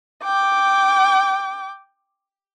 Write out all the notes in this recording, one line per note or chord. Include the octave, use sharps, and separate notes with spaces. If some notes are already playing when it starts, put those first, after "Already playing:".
G5 D6